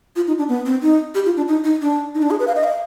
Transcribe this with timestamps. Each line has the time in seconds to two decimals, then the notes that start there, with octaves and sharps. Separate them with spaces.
0.16 F4
0.27 D#4
0.38 D4
0.48 B3
0.65 C4
0.82 D#4
1.15 G4
1.26 F4
1.37 D4
1.48 D#4
1.64 D#4
1.82 D4
2.15 D#4
2.22 D4
2.31 G#4
2.40 B4
2.47 F5
2.55 D#5
2.64 F5